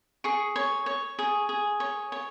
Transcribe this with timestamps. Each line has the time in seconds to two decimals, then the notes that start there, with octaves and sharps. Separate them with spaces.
0.24 G#4 C#6
0.56 C#5
0.86 C#5
1.19 G#4
1.49 G#4
1.80 C#5
2.12 C#5